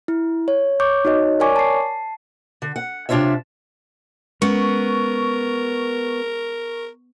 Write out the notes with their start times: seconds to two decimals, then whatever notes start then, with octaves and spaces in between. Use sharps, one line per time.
0.08 E4
0.48 C#5
0.80 C#5 C#6 D6 G6
1.05 D#4 F#4 C#5 D#5
1.40 A#4 C#5 D5 G#5 C#6 D6
1.56 A5 C7
2.62 D3
2.76 F#5
3.09 C3 D4 E4 F4 C#5 E5
4.42 G#3 B3 C#4 A#4 C#6